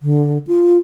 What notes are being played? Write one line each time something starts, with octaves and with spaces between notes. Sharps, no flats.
D3
F4